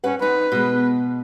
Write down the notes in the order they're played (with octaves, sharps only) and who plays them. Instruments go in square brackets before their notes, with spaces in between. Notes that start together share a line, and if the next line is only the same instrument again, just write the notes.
[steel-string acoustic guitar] G2 B4 F#5 [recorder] C#4
[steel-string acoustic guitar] F2 D#4 [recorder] B4
[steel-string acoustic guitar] B2 G#3